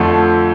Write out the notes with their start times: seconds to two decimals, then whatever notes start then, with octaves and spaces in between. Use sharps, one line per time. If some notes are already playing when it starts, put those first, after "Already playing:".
Already playing: F2 D3 F3 A3